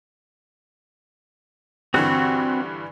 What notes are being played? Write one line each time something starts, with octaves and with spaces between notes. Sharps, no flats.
G2 D3 E3 C4 F#4 F#5